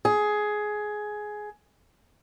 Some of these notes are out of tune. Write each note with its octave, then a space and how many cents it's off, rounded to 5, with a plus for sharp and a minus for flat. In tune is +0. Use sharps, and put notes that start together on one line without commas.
G#4 +15